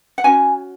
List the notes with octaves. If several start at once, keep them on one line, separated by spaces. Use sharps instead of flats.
F#5
C#4 F#4 G#5